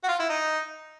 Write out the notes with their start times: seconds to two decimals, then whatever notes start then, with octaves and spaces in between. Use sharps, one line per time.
0.04 F#4
0.08 F4
0.19 E4
0.29 D#4